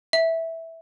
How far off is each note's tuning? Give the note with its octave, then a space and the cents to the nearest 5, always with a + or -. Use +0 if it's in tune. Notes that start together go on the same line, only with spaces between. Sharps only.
E5 -5